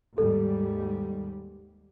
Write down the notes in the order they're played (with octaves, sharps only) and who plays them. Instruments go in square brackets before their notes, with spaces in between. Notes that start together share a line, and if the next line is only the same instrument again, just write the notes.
[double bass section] D#2 G#2 G3 [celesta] A4